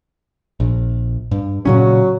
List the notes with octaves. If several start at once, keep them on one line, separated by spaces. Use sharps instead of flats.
A#1
G2
A#2 C#3 F#3 C#4